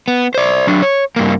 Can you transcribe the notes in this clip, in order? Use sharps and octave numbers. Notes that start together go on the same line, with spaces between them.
B3
C5 D5
F#3 D4
C#5
G2 A#3